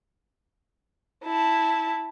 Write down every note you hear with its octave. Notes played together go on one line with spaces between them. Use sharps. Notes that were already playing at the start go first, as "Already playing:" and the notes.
E4 A5